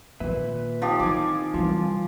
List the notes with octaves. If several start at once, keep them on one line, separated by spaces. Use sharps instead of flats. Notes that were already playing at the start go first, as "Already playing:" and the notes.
A#2 D#3 A#3 B4 E5
F3 C4 D#4 G4
D#3 E4 G#5 D6
C2 E3 F4